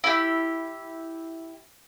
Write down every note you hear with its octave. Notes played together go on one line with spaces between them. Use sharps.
E4 G4